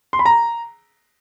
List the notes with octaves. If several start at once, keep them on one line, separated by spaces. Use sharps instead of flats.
C6
B5
A#5